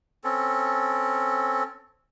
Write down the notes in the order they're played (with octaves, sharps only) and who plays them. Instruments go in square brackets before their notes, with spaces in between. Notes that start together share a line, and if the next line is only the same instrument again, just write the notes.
[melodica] C4 C#4 A4